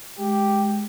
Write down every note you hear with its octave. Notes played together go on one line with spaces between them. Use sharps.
G#3 G4